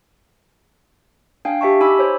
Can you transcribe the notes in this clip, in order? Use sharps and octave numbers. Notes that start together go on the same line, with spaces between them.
D4 F5 G5 G#5
G4 E5 A5 C#6
D#4 G#5 B5 D6 E6
C5 C#5